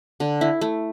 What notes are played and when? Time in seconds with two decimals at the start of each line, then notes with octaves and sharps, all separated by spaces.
0.20 D3
0.41 E4
0.61 A3